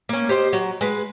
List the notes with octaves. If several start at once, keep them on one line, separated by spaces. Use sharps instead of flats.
A#3 C#4
G4 C5 D#5
F#3
G#3 B4